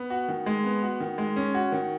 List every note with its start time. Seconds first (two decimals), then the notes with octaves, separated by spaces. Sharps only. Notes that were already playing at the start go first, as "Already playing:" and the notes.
Already playing: B3
0.10 F#4
0.28 D#3
0.46 G#3
0.64 B3
0.83 F#4
1.00 D#3
1.18 G#3
1.36 C#4
1.54 F#4
1.72 D#3